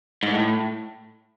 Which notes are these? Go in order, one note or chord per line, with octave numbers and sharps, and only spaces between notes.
G#2
A2